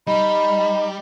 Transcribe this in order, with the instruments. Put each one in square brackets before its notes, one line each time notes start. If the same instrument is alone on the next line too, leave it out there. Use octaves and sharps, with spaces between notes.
[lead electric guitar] G3 [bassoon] D#4 [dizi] B5